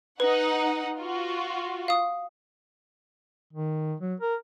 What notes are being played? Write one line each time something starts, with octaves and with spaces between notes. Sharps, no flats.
D#4 B4 F#5
F4 F#4
F5 D#6
D#3
F#3
A#4